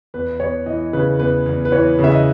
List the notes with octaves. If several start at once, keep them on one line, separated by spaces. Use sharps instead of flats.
E2 B4
E2 C#5
E3 D#5
C#3 B4
E2 B4
E2
B4
E3 C#5
C#3
E5
D#5